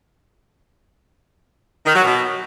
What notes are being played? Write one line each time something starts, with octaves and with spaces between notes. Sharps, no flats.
D#3
F#3
B2